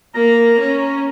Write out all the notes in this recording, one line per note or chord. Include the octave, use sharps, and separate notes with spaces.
A#3 A#5
C#4